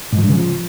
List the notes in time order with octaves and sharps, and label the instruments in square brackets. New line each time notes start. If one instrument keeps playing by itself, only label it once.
[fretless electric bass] G#2
F3
G2
C#3
F3